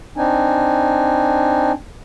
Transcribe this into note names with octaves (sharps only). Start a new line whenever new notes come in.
C4 D4 D#4 G#5